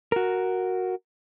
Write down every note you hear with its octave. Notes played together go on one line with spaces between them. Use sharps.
F#4 A#4